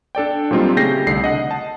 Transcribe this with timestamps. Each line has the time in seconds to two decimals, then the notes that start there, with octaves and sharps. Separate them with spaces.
0.15 D4 A4 D5 G5
0.51 A#2 F#3 G3 C4 D#4 F4
0.76 C#3 A3 G4 G6 A#6 C7
1.07 C2 D3 C7
1.24 D#5 F#5
1.51 A5